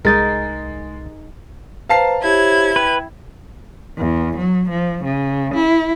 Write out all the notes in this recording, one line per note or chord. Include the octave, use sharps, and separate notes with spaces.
C2 G#3 D#4 G#4 A#4 A6
B4 C5 F5 A5 A#5 C7
E4 G4 C5 C#5 G#6
B4 G5
E2
F#3
F3
C#3
E4